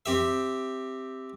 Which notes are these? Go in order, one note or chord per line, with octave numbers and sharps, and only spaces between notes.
C4 G4 E5